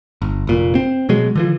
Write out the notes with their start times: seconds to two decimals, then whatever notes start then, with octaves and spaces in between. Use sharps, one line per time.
0.22 G1
0.47 F1 A#2
0.75 C4
1.09 B2 F#3 G#3
1.36 D3 E3 F3